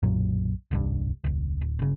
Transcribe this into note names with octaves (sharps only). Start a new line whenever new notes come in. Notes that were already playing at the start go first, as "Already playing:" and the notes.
B1 F#2 A#2 F#3
D#1 C2 G2
E1 C#2
D1
G1 C#3